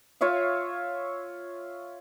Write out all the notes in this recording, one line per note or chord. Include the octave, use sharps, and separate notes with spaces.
F4 C#5 E5 F5